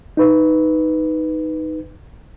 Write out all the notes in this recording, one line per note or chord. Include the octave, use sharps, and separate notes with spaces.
D#4 B4